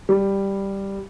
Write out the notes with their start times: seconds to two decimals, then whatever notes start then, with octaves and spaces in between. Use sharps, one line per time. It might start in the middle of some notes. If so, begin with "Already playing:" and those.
0.09 G3